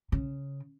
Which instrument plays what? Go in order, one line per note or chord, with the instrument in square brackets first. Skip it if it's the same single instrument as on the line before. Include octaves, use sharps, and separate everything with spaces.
[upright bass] C#3